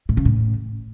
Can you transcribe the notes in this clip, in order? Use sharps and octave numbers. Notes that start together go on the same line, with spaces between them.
A2
C#3
A2